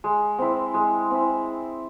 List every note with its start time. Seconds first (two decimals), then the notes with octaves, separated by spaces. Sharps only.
0.04 G#3
0.38 C4 E4
0.74 G#3
1.11 C4 E4